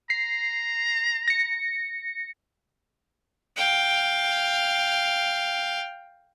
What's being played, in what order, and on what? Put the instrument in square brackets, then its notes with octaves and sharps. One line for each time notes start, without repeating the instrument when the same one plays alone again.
[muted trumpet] A#5 [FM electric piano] C7
[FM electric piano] A#6 C#7
[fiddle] F5 G5